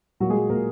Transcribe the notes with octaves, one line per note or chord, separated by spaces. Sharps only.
A#2 F#3 F#4
G#3 G#4
F#3
A#2 A#3 A#4